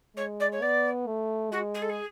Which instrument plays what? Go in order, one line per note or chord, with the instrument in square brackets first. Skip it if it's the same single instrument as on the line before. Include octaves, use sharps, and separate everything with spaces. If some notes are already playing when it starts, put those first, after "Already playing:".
[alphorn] G#3 [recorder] C#5
[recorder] D5
C#5
[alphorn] B3 [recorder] D5
[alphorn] A3
[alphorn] G#3 [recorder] F#4
[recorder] G#4
A4
G#4